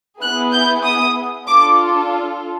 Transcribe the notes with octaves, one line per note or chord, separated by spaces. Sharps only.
B3 E4 G#4 F#6
G6
D#6
D4 F4 A4 D6